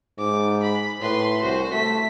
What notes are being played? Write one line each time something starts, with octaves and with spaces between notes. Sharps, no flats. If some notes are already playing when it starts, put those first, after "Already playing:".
G#2 D6
B5
A2 B4 C6
C2 F#4 C5
A3 B6